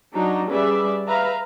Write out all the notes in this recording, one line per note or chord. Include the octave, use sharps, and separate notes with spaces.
F#3 D4 D#4 F#4 A#5
G3 C#4 G#4 B4 D5 E5
B4 E5 F5 A#5